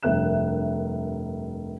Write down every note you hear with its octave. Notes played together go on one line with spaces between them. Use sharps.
F1 G2 A#4 E5 F#6 E7